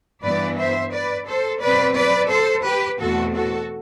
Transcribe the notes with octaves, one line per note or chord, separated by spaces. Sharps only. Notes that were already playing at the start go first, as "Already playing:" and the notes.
G2 E3 B3 B4 D5
C5 E5
B4 D5
A4 C5
B2 F#3 C4 B4 D5
B4 D5
A4 C5
G4 B4
E2 B2 A3 C4 F#4 A4
F#4 A4